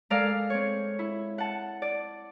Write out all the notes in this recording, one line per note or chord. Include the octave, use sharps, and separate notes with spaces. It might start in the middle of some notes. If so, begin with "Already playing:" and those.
G#3 A4 A#4 D5 F5
C4 C#5
E4
F#5 A5
D5